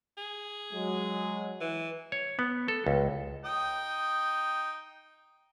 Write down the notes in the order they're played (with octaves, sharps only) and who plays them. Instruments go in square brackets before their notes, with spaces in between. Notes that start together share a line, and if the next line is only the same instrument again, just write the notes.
[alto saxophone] G#4
[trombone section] F#3 G#3
[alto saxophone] E3
[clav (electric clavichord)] C#5
B3
A4
C#2
[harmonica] D#4 G5 D#6